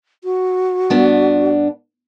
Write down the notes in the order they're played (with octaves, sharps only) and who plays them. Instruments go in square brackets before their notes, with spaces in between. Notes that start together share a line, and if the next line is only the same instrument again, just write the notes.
[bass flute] F#4
[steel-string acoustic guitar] G2 B3 D4